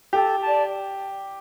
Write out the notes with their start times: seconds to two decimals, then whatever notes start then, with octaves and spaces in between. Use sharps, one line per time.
0.13 G4 A4
0.41 D5 A5